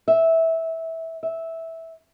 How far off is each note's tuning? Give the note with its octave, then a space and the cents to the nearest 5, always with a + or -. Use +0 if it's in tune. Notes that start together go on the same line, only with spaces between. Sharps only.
E5 -15
E5 -10